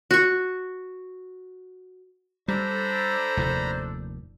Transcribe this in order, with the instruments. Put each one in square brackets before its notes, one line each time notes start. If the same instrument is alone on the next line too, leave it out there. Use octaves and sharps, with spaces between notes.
[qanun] F#4 C#6
[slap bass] G3 [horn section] D4 A4 [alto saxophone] C5 [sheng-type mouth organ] A#5 B5
[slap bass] F1 D#2 A#2